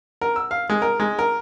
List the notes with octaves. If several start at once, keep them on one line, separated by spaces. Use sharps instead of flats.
A#4
E6
F5
G#3
A#4
G#3
A#4